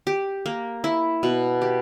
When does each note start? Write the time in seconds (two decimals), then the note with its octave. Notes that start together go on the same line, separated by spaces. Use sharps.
0.07 G4
0.46 A#3
0.84 E4
1.23 B2
1.62 G4